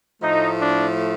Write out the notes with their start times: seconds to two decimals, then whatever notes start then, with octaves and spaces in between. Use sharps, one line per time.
0.22 A2 F3 A3 D#4
0.61 D4